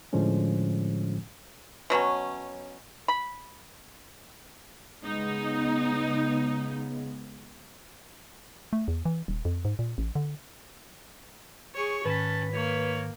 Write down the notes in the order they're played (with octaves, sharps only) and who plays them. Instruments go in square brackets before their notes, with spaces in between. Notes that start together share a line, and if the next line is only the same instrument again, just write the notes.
[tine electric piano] A2 D3 F3 G#3 C#4
[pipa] B2 F#3 B3 C#4
B5
[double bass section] C#3 G#3 B3 [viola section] D#4
[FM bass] A3
E2
E3
D#1
F2
G#2
A#2
A1
D3
[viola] G#4 C#5 [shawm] C#6
[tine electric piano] G#2 D#3 [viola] C#4 [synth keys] B4 B6 [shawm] A5
[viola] A#3 [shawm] C#5